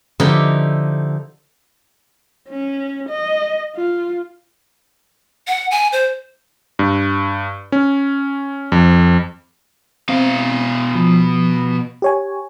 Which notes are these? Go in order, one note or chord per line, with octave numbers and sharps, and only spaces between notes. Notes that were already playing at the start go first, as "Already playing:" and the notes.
D3 F3 D#4 E4 G4 B5
C#4
D#5
F4
F#5
G#5
C5
G2
C#4
F2
B2 C4 F5
F3
G4 C#5 G#5